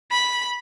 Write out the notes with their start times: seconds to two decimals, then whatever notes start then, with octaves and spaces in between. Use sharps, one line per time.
0.11 B5